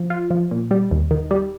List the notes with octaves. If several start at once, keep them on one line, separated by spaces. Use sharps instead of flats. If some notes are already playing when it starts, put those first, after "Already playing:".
Already playing: F3
F4
F3
A#2
G3
D#2
D#3
G3